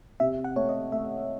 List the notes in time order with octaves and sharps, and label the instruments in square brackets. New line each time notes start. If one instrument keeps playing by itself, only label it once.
[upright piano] C3 [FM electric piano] E5
[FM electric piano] F#5
[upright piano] A3 [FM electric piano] C#5
[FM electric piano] D#5
[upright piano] A3 [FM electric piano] E5